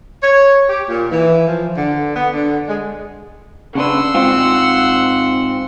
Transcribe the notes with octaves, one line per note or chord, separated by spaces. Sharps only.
C#5
G4
A#2
E3
F3
D3
B3
D3
G#3
C#3 D4 B4 F#5 C6 E6
G#2 C4 F4